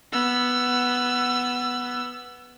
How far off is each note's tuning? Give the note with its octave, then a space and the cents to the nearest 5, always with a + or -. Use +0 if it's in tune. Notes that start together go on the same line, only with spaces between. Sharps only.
B3 +0 E6 +20